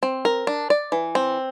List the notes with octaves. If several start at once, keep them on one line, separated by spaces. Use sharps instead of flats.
C4
A#4
D4
D5
E3
C4